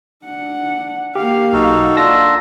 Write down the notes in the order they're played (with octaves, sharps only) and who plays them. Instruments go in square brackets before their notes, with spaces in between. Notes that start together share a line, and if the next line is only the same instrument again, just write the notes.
[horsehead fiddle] D4 F#5
[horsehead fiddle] A#3 F5 [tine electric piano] G4
[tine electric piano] B1 [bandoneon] D#4 F#4 A4
[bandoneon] D4 F4 [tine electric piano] A5 E6 A#6